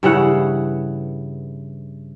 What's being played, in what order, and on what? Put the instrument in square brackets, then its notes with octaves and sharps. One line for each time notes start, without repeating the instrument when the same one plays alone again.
[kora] G2 C#3 E3 F#5